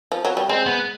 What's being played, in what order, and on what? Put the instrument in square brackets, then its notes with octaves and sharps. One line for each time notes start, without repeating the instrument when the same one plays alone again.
[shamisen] F3
F#3
G3
[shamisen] G#3 [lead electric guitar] C4
[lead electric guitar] B3